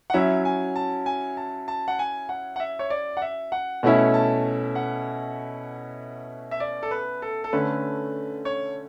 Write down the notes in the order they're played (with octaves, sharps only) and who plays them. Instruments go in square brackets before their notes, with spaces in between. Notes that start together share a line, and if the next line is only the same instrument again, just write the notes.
[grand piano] F#5
[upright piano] F#3 C#4 E4 [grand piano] E5
[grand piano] G#5
A5
G#5
A5
A5
F#5
G#5
F#5
F#5
E5
C#5
D5
F#5
E5
F#5
[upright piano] B2 A3 C#4 E4 [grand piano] F#5
[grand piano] A5
F#5
E5
D5
A4
B4
A4
A4
[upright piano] D3 A3 C#4 [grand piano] B4
[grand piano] C#5